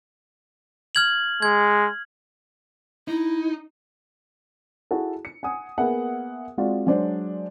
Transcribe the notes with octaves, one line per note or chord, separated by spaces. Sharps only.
F6 G#6 F#7
G#3 G#6
D#4 E4
E4 F#4 G#4 A4
C#7
F#5 G#5 D#6
A#3 B3 G#4 E5 F#5
G#3 C4 F4 F#4 D5
F#3 G#3 D4 C5